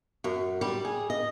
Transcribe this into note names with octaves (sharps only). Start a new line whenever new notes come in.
F#2
G3
G#4
D#5